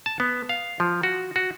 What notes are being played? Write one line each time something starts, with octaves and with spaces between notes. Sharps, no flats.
A5
B3
F5
F3
F#4
F#4